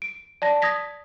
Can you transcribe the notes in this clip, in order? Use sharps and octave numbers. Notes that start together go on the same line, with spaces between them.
D7
D5 A5 A#6
D#6 G#6 A#6 B6